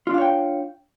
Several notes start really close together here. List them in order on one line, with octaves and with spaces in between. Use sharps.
F4 D4 F5 C#5 G5